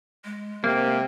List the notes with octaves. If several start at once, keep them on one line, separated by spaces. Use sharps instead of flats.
G#3
C3 A#3